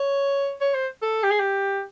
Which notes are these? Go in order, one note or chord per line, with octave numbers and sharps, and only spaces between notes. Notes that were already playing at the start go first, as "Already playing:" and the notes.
Already playing: C#5
C#5
C5
A4
G4
G#4
G4